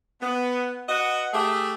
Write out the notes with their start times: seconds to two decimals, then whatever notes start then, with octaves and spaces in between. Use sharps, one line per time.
0.21 B3
0.89 F#4 B4 D#5 F#5
1.33 A3 G4 G#4 E5